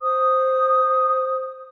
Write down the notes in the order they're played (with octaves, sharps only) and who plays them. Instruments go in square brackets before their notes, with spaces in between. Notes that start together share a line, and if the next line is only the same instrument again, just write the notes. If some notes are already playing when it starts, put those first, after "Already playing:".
[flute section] C5 D#6